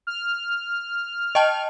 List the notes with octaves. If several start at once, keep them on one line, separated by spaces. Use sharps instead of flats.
F6
D#5 G5 A5